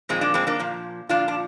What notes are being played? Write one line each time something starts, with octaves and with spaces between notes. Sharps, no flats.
A#2 F3 G#3 C4
A#3 D4
G#3 C4
A#3 D4
A#2 F3
A#2 F3 D4 F4
D4